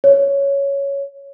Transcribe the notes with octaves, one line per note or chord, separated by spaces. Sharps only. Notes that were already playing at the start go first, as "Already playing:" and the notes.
C#5